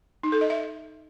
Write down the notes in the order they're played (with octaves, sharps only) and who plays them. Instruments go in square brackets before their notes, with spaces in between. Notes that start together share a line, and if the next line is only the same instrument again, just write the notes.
[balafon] D#4
A4
D#5
E5